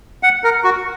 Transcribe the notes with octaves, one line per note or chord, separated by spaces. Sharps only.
F#5
A#4
F#4